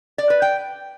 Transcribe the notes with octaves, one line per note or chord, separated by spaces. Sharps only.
D5
B4
G5